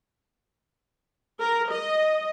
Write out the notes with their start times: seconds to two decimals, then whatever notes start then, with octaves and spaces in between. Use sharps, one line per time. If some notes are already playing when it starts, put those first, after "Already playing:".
1.40 A#4
1.71 D#5